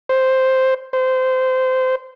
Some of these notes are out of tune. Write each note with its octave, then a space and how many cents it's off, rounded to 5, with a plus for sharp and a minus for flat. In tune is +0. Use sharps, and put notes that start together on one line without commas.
C5 +0
C5 -20